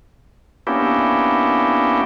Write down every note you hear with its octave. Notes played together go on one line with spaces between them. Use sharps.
A#3 B3 C#4 D4 E4 G4